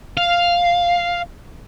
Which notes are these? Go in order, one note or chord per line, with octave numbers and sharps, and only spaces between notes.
F5